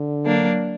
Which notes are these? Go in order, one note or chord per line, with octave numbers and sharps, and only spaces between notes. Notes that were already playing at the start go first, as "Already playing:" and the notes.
Already playing: D3
F#3 A#3 D4